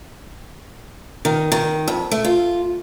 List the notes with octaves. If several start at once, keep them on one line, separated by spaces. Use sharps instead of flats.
D#3
D#3
F2
A3
F4